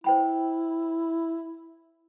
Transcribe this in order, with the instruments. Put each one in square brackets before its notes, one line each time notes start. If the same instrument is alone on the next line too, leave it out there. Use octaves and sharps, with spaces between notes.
[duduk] E4 [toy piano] C5 G5 B5